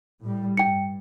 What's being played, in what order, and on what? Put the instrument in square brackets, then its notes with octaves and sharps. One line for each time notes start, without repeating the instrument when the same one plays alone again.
[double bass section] A2 G3
[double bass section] G2 [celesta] G5 C#7